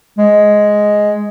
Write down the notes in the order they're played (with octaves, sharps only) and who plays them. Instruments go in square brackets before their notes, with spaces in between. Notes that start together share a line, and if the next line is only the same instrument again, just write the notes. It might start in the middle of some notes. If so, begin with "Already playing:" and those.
[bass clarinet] G#3